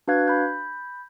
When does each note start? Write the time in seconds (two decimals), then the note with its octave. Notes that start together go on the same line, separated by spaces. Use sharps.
0.08 D4 F#4 B4 F5 F#6 G#6
0.28 B5 G6